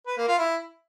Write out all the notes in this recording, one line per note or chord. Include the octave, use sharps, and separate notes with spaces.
B4
A#3
F4
E4